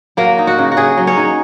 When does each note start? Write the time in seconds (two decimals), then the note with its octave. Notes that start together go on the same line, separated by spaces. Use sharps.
0.17 F#3 A#3 A#4
0.39 D#4
0.47 F#4
0.58 C#3
0.72 F#4
0.77 C#3 G#4
0.97 F#3
1.07 C#4 C#5
1.17 D#4